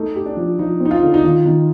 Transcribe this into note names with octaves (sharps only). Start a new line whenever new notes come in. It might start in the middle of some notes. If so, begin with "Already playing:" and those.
Already playing: A3 D#4
G4
D4
F3
F3 D#4
C4
D#4
F4
D3
D#4
D#3 F4
D#3